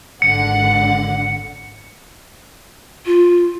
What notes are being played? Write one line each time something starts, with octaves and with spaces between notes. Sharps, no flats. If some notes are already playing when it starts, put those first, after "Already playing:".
G#1 D3 F#5 C#7
F4